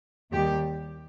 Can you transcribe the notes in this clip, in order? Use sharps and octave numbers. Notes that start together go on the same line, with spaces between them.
D#2 D#3 G3 G4